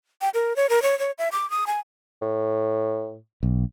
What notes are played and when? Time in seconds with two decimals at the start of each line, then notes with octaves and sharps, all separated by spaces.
0.21 G5
0.34 A#4
0.56 C#5
0.70 A#4
0.82 C#5
0.99 C#5
1.18 E5
1.32 D6
1.50 D#6
1.67 G#5
2.22 A2
3.43 B1